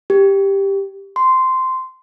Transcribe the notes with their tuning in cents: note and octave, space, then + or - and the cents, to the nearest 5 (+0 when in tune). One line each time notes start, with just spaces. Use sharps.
G4 +5
C6 -10